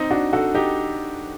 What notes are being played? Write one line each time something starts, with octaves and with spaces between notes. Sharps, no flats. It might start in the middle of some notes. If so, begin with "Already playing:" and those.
Already playing: C4 D#4
D4 F#4
F#4 A4
D#4 G4